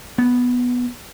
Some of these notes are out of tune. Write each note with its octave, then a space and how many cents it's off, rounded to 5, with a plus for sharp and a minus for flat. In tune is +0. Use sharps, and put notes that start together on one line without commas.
B3 -5